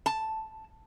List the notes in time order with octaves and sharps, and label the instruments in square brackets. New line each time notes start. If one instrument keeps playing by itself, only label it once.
[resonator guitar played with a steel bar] A5